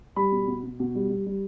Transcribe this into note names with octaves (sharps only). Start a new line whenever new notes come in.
G3 B5
B2
B2
B2
B2
G3
G3
G3